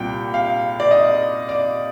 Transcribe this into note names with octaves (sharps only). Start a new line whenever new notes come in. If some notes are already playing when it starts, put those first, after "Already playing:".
Already playing: C2 A#2 G3 G5
F5
D5
D#5
D5